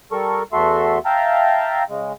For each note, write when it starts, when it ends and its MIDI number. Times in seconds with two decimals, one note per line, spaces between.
0.12 0.43 55
0.12 0.43 69
0.12 0.43 70
0.12 0.43 85
0.53 0.98 40
0.53 0.98 57
0.53 0.98 66
0.53 0.98 69
0.53 0.98 76
0.53 0.98 84
1.05 1.83 76
1.05 1.83 77
1.05 1.83 79
1.05 1.83 81
1.05 1.83 82
1.89 2.12 49
1.89 2.12 56